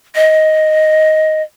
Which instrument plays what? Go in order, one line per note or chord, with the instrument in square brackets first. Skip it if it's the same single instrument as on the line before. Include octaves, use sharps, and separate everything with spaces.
[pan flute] D#5